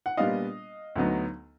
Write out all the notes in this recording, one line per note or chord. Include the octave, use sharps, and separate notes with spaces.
F#5
A#2 G3 B3 D4 F4 D#5 F5
D2 D3 F#3 B3 D#4